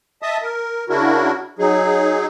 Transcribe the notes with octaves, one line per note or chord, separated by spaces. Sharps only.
D#5 E5 A5 D#6
A#4
C#3 D4 E4 F#4 A#4
F#3 D#4 G#4